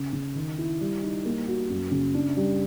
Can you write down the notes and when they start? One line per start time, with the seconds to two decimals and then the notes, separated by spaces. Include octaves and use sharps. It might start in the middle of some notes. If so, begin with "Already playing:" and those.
Already playing: C#3
0.13 C#3
0.35 D#3
0.58 E4
0.81 G3
1.03 D#4
1.25 A#3
1.47 F#4
1.70 F#2
1.92 C#3
2.14 D4
2.37 G3